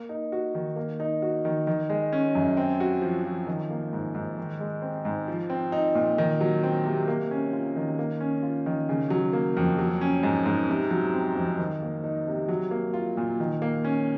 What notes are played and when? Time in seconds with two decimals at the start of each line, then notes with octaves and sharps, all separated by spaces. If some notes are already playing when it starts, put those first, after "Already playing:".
Already playing: A#3
0.09 D#4
0.32 F#4
0.55 D#3
0.76 A#3
1.00 D#4
1.22 F#4
1.45 D#3
1.67 D#3
1.90 G#3
2.13 C#4
2.35 F#2
2.57 C4
2.80 F#4
3.02 F3
3.25 F3
3.47 D#3
3.70 A#3
3.93 G#2
4.15 G#2
4.38 D#3
4.60 G#3
4.82 C4
5.05 G#2
5.28 F3
5.50 C4
5.72 D#4
5.95 A#2
6.18 D#3
6.41 F#3
6.63 C4
6.85 C3
7.08 A#3
7.31 C#4
7.53 F4
7.76 D#3
7.99 A#3
8.20 C#4
8.43 F4
8.66 D#3
8.89 C#3
9.10 F#3
9.33 A#3
9.57 F2
9.79 F#3
10.01 C#4
10.23 G#2
10.46 G#2
10.69 C3
10.91 F#3
11.14 C4
11.36 F2
11.59 D#3
11.82 A#3
12.04 D#4
12.27 C3
12.49 F#3
12.71 A#3
12.94 F4
13.17 A#2
13.40 D#3
13.62 A#3
13.84 C#4